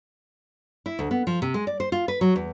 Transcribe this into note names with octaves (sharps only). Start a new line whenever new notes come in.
E4
D2
B3
F3
C3
G#3
D5
C5
F4
B4
F#3
E2